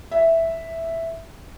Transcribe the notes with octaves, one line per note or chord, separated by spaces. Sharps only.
E5